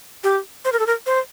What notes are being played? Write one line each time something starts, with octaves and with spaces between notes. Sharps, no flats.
G4
C5
A#4
A4
A#4
C5